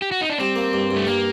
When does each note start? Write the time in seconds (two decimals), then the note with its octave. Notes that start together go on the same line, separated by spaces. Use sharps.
0.02 G4
0.12 F#4
0.21 D#4
0.30 D4
0.39 G3 C4
0.56 A#3
0.73 G2
0.91 G2
0.96 A3
1.07 G3 A#3